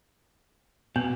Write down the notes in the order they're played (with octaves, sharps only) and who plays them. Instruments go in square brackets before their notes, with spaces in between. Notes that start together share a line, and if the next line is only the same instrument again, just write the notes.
[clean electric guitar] B2 [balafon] B3